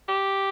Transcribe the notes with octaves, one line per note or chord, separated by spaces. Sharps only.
G4